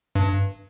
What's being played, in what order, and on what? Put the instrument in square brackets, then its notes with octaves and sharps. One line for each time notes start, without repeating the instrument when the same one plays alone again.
[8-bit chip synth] G2